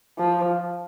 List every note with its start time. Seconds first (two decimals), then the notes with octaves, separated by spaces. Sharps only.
0.18 F3